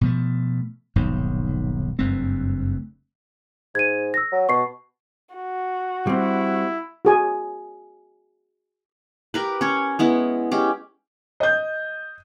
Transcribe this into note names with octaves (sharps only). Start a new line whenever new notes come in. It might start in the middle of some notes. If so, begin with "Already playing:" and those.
B2 F3 A3
D#1 B1 G#2
F#1 G2 A3 C4
G#2 G#6 D#7
E6 A#6
F#3
B2 C#6 C7
F#4
G3 C4 E4
F#4 G#4 G#5
G4 A#4 B4
C#4 C#5
G#3 B3 E4
G#3 C#4 G4
D#5 G6